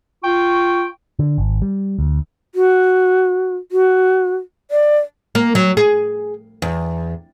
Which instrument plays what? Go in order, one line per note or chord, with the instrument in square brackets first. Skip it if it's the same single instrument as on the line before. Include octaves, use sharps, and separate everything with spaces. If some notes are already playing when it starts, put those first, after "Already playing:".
[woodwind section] F4 G5 C#6
[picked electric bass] D3
G#1
G3
D2
[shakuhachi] F#4
F#4
D5
[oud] A#3
F#3
G#4
E2